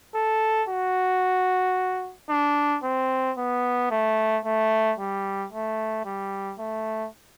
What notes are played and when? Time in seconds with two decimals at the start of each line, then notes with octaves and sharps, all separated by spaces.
0.15 A4
0.68 F#4
2.30 D4
2.83 C4
3.38 B3
3.91 A3
4.45 A3
4.99 G3
5.52 A3
6.05 G3
6.59 A3